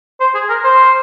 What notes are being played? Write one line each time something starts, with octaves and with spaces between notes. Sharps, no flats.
C5
G#4
A#4
C5